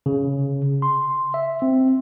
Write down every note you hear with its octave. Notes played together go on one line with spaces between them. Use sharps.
C#3
C6
E5
C4